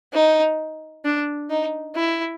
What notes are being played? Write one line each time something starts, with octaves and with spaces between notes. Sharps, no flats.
D#4
D4
D#4
E4